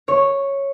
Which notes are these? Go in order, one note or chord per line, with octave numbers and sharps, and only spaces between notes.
C#5